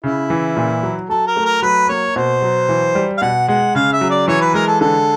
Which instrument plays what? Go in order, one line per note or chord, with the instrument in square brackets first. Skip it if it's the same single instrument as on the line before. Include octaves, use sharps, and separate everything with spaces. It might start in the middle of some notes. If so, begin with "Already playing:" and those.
[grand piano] C#3 [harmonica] E4
[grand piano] E3
A#2
F#3
[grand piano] F#3 [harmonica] A4
[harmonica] A#4
[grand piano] A3
[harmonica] A#4
[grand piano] F#3 [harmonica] B4
[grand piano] A#3 [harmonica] C#5
[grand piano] B2 [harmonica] C5
[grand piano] F#3
E3
G3
[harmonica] F5
[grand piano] B2 [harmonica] F#5
[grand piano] G#3 [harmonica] F#5
[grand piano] C#3 [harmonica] F5
[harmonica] E5
[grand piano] F#3
[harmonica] D5
[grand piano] E3 [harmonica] C#5
[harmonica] B4
[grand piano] G#3 [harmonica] A#4
[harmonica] A4
[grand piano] D3 [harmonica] A4